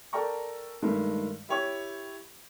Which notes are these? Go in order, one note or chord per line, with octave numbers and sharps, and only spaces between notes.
A4 A#4 D5 G5 A#5 C#6
G2 D#3 G#3 A3
E4 G4 C#5 G5 C#6